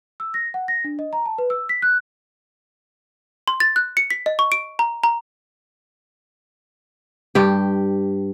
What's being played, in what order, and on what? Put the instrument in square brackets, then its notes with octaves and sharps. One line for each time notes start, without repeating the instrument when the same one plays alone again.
[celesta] E6
A#6
F#5
A#6
D4
D#5
A#5
A5
B4
E6
B6
F#6
[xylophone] C6
A6
F#6
C#7
B6
D#5
C#6
D7
A#5
A#5
[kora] G2 G4